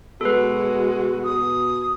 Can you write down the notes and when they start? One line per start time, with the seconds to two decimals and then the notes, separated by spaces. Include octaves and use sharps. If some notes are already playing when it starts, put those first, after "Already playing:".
0.21 B2 G#3 F#4 A4 B4
1.24 D#6